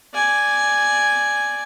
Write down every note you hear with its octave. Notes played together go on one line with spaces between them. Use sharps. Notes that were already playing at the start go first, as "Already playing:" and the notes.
D5 G#5